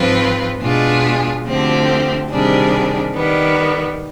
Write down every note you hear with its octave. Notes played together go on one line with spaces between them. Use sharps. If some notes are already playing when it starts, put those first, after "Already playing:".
Already playing: G#2 F3 C4 F4 B4
B2 G#3 D4 F4 G#4
D2 D3 F3 C4 G4
C3 D#3 G3 D4 G#4
D#3 G3 B3